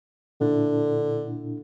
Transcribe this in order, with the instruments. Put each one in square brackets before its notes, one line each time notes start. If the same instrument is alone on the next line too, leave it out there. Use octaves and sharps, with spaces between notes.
[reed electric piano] A#2 D4 E4 [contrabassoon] D3